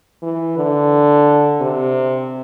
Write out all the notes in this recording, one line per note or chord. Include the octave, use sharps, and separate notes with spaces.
E3
D3
C3